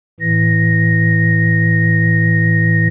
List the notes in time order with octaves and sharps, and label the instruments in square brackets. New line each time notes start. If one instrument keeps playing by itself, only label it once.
[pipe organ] A2 E3 A#6